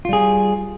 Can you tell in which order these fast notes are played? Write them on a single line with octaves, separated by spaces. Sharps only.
F4 G3 G#4